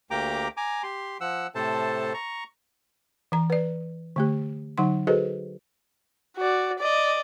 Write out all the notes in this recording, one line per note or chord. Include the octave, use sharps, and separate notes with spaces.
D2 A#3 G4 G5 A#5 D6
G#5 A#5 D6
G4 C6
F3 F#5 E6
A2 C3 A4 C5 A5
A#5 C#6
E3 A#5
B4 D5
D3 A3 G4
D3 F#3 D#4 F#5 C6
F#4 G#4 A4 B4 C5 D#5
F#4 D5
D5 D#5